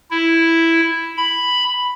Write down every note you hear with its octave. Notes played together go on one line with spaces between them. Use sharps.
E4
B5